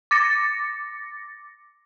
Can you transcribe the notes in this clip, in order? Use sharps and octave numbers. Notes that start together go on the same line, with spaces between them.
D6 A6 A#6 C#7